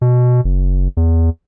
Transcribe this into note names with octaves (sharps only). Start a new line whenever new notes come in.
B2
F#1
E2